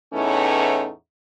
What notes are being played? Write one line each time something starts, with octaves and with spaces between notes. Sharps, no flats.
E2 A2 E3 A3 C#4 D#4